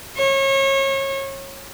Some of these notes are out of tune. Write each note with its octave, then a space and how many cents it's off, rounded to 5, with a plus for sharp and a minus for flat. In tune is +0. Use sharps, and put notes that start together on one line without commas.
C#5 -30